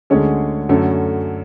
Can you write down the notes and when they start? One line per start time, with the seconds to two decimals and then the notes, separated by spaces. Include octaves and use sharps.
0.10 D2 D3 G#3 C#4 G#4
0.69 F#2 D3 A3 C#4